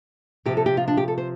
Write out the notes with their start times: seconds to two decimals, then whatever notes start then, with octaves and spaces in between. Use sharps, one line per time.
0.46 C3 F3 C4 G4
0.57 A4
0.66 G4
0.77 F4
0.88 D4
0.97 G4
1.08 A4
1.18 C5